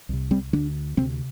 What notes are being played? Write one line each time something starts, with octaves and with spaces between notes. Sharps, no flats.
C2 C3
G3 C4
D2 D3 A3 D4
D2 C3 G3 C4